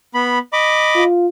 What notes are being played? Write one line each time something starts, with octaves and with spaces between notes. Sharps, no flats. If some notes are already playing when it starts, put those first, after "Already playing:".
B3 B5
D#5 B5 D6
F4